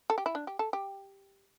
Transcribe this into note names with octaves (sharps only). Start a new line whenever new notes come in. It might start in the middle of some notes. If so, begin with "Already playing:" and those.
A4
G4
E4
D4
G4
A4
G4